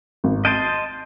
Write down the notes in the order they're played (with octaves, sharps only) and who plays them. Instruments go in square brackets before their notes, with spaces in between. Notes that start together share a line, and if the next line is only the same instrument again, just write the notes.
[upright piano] G#1
[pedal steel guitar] D#5 A5 C6 [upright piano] G6 D7 D#7